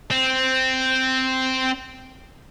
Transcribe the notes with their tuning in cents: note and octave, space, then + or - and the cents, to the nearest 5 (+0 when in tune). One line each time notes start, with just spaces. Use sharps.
C4 -5